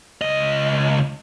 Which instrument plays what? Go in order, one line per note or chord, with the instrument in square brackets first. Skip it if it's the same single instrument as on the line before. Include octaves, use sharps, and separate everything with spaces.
[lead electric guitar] C#2 D#5